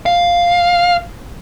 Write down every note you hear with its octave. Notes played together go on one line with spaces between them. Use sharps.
F5